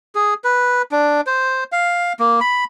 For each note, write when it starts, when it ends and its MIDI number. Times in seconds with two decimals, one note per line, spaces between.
0.15 0.34 68
0.44 0.82 71
0.91 1.21 62
1.27 1.64 72
1.72 2.13 77
2.19 2.40 58
2.40 2.64 83